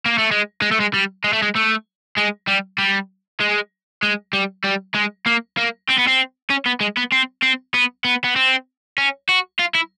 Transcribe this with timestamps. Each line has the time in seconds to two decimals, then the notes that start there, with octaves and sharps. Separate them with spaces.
0.06 A#3
0.18 A3
0.31 G#3
0.62 G#3
0.71 A3
0.80 G#3
0.94 G3
1.24 G#3
1.33 A3
1.42 G#3
1.56 A3
2.18 G#3
2.48 G3
2.78 G3
3.40 G#3
4.03 G#3
4.33 G3
4.64 G3
4.95 G#3
5.26 A#3
5.57 A#3
5.89 C4
5.98 B3
6.07 C4
6.50 C#4
6.66 B3
6.80 G#3
6.97 B3
7.12 C4
7.42 C4
7.74 B3
8.05 B3
8.24 B3
8.36 C4
8.98 C#4
9.29 F#4
9.59 F4
9.75 E4